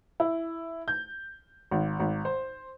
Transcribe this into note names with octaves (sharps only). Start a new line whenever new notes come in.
E4
G6
G#1
G#1
C5